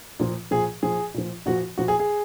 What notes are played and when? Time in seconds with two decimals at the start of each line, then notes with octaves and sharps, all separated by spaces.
0.20 A#2 F3
0.51 A#2 F3 G#4
0.83 A#2 F3 G#4
1.14 A#2 F3
1.46 A#2 F3 F#4
1.78 A#2 F3 F#4
1.88 G#4
2.00 G#4